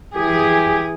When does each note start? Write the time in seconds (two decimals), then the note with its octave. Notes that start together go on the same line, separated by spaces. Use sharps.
0.15 E3 G4 G#4